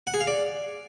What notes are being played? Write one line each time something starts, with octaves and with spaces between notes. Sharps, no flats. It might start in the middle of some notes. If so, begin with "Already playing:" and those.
F#5
G#4
F5
D5